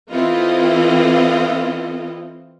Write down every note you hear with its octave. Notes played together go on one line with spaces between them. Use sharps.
E3 C4 E4 F4 A4 D#5